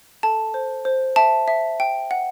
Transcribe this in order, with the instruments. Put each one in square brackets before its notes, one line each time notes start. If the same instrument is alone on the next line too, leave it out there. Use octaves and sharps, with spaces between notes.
[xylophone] A4 A5
C5
C5
E5 A5
E5
G5
F#5